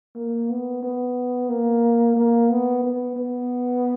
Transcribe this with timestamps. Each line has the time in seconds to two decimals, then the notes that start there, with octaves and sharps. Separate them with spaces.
0.16 A#3
0.50 B3
0.83 B3
1.49 A#3
2.17 A#3
2.50 B3
2.83 B3
3.17 B3